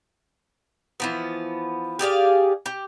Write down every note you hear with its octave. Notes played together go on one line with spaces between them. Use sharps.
E3 F3 B3
G4 G#4 D5 F5
G4